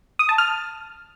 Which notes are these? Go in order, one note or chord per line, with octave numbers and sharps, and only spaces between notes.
D#6
A5
F6